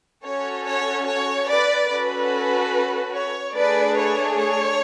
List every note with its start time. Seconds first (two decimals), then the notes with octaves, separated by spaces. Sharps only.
0.24 C#4 F#4 A4 C#5
0.66 C#5
1.07 C#5
1.48 B4 D5
1.90 C#4 F#4 A4 B4
3.14 C#5
3.55 A3 D4 G#4 B4 D5
3.97 C#5
4.39 C#5